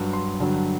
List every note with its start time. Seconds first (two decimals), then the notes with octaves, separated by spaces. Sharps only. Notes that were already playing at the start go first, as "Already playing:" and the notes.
Already playing: G2 F#3
0.13 C6
0.40 G2 D3 F#3